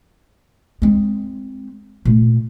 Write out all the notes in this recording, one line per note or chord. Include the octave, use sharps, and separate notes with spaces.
G#3 C4
A#2 A3